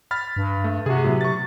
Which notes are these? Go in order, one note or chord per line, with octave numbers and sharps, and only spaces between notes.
B5 F6 A6
G2
A3
C3 F#4 G#4
A2 F#3 B3
C#6 A6